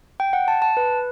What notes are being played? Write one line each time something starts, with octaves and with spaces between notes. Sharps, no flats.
G5
F#5
A5
A5
B4